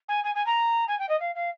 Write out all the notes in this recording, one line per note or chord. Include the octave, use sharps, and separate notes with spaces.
G#5
G#5
G#5
A#5
G#5
G5
D#5
F5
F5